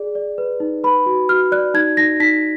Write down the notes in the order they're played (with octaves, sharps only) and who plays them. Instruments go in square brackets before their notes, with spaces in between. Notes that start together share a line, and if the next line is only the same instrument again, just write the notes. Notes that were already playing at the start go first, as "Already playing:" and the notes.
Already playing: [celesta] G#4 D5
D5
B4
D#4
B4 B5
F#4
F#4 F6
D5 F#6
D#4 G#6
D#4 A#6
D#4 B6